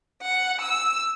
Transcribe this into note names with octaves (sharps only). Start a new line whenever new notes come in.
F#5
E6